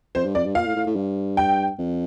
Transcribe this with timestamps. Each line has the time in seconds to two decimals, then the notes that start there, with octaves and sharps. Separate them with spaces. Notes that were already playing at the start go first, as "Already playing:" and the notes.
0.15 F2 C5
0.25 G2
0.35 F2 D5
0.45 G2
0.55 A#2 F5
0.66 A2
0.76 A2
0.86 A2
0.96 G2
1.37 G5
1.79 F2